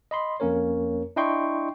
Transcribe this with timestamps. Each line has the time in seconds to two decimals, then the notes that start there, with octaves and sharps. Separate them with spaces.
0.11 D#5 B5 C6
0.40 F2 A#3 C#4 A#4 C#5
1.16 D4 E4 D#5 G5 C6 C#6